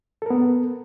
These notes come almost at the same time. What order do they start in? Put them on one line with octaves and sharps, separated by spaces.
A4 A#4 B3